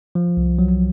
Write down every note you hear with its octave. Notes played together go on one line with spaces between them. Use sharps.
F3
C2
F#3